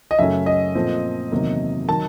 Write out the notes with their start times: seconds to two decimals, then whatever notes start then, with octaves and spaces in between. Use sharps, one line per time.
0.11 D#5
0.19 F#2 C#3 F#3 A3 C#4 E5
0.46 D#5
0.75 A#2 F3 A3 C4
1.32 E2 C3 D#3 F#3 A#3
1.88 D#3 F#3 A5